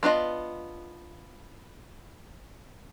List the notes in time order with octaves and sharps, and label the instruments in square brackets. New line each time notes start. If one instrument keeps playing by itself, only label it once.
[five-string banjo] B3 D4 F4 D#5